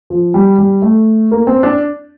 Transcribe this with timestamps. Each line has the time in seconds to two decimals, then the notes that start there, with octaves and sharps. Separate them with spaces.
0.10 F3
0.34 G3
0.58 G3
0.82 A3
1.31 A#3
1.47 C4
1.63 D4